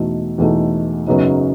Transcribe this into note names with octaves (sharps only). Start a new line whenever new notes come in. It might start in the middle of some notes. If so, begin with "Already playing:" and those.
Already playing: E2 B2 A3 D#4
E2 B2 A3 D#4
F#2 C#3 F#3 B3 D#4